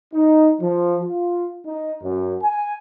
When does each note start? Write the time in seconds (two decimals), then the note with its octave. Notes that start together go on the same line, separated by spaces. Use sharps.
0.14 D#4
0.61 F3
1.02 F4
1.65 D#4
2.02 F#2
2.42 G#5